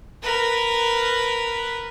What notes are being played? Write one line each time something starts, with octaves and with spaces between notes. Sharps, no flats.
A#4 B4